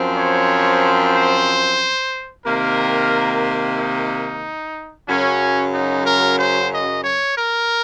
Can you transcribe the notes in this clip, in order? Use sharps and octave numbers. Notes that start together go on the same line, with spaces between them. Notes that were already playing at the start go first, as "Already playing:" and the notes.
Already playing: F#2 F3 C4
C#5
C5
C3 D#3 A#3 A#4
D#4
F#2 C#3 F#3 C#4
D#4
A#4
C5
D#5
C#5
A#4